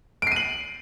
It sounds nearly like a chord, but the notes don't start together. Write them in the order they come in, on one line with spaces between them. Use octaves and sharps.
D7 C7 D#7 F#7